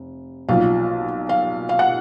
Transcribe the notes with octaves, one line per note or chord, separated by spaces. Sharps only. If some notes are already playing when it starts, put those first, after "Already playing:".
Already playing: F1
B1 A#2 F3 F5
F5
F5
F#5